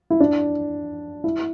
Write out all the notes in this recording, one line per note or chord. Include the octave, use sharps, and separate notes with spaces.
E4
D4
E4